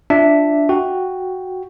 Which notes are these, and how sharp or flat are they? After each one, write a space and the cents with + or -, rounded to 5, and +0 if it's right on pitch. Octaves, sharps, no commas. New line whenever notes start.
D4 +0 F4 +0 E5 +0
F#4 +0 G5 +0